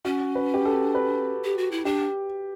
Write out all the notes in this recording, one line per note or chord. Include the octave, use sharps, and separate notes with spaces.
C#4 F#4
B4
G4
A4
B4
G4
F#4
E4
D4 G4